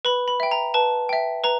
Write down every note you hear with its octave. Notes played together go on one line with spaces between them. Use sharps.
B4 B5
B5
E5 G5
A#5
B4 A5
E5 G5
B4 A#5